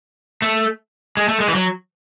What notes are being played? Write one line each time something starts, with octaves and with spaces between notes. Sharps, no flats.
A3
G#3
A3
G#3
E3
F#3